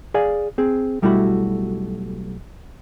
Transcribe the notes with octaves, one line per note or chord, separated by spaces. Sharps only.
G#4 D5 F5 G#5
C4 G#4
B1 G3 A3 E4 F#4 B5